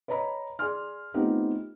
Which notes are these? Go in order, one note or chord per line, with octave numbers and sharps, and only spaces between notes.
B4 C#5 D#5 A#5 B5
G#4 D5 G#5 C6 F6
A3 B3 C4 D#4 F4 G4